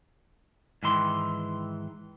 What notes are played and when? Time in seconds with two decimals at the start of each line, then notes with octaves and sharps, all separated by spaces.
0.83 G#2 D#3 E3 C6